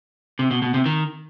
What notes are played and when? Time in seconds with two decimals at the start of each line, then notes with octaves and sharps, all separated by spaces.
0.39 C3
0.51 B2
0.62 B2
0.74 C3
0.86 D#3